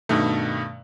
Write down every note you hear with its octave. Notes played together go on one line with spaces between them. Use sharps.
G2 B2 D#3 A3